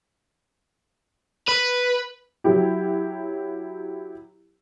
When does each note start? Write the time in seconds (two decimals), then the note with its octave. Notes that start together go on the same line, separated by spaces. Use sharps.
1.48 B4
2.44 F#3 E4 G4